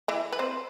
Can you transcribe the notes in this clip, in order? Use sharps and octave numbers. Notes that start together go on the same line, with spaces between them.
E3 E4
B4
C4 C5